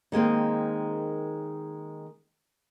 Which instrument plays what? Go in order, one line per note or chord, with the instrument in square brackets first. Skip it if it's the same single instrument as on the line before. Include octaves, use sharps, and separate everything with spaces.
[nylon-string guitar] D#3 G#3 A#3 C4